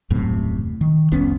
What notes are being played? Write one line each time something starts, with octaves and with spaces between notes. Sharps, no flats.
D#1 F#2 A2 C3
D#3
F1 C2 B3 C#4